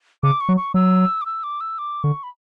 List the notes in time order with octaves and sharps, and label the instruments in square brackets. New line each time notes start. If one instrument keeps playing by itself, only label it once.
[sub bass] C#3 [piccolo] D6
[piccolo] C#6
[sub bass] F#3
[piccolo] C#6
[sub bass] F#3 [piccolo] E6
[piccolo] D6
E6
D6
E6
D6
[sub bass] D3 [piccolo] C#6
[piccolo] B5